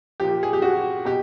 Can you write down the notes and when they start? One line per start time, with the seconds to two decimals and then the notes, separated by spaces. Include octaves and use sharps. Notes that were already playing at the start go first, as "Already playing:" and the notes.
0.20 A#2 F3 G4
0.43 G#4
0.53 G4
0.62 F#4
1.05 B2 G4